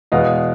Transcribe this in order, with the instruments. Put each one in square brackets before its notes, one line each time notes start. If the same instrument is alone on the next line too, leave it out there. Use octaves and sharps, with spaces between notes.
[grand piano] E2 B2 G#3 D#5 F5